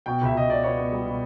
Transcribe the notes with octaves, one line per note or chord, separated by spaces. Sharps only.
B2 G5
C#2 E5
C#2 D#5
B2 D5
B3 C#5
B3
G3
B2